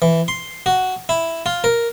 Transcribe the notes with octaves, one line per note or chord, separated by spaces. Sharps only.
E3
C6
F#4
E4
F4
A#4